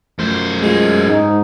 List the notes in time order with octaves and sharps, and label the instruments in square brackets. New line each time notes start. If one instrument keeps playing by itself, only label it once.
[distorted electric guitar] F#2 C5 [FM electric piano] F3 A3
[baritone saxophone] G#3 [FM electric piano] A3 F4
[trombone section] G#2 D#4